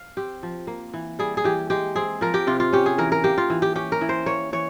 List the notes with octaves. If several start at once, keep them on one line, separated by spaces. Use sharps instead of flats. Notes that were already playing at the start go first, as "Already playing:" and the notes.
Already playing: F5
C4 G4
F3
A#3
E3
G3 G#4
G#4
E3 G4
G#3 G4
C4 G#4
F3 A#4
G4
C3 F4
F4
C#4 G4
G#4
E3 A#4
A#4
A#3 G4
F4
E3
G4
C#4 G4
A#4
E3
C5
A#3 C#5
E3 C#5